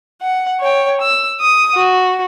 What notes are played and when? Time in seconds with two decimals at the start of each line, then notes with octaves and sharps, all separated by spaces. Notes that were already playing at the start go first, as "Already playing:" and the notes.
0.22 F#5
0.61 C#5 G5
1.01 E6
1.40 D#6
1.75 F#4